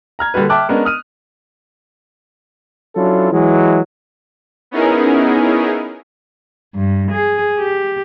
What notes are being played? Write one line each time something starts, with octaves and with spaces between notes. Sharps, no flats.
A#5 F6 G#6
D3 G3 A#3 F#4 B4
E5 G5 A5 D6 F#6
G#3 B3 C#4 D4 A#4
D#6 F6 D#7
F#3 C#4 D4 E4 F4 A4
E3 F#3 G#3
B3 C#4 D#4 E4 G#4 A#4
G2
G#4
G4